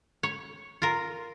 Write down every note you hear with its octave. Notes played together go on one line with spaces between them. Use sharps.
C#5
F4 A#4